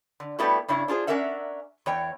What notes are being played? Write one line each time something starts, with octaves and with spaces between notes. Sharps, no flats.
D3
G3 A3 B3 E4 F#4
G2 C#3 D4 E4 C#5
D4 F4 G#4 C5
C#4 D4 A#4 E5 F#5
E2 C#5 G5